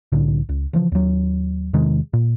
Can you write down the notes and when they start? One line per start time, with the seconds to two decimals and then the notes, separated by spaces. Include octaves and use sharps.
0.12 C2 A2 D3
0.49 C#2
0.73 C#3 E3 F3
0.92 D#2 F#3
1.73 E2 C3 D#3 G#3
2.13 A#2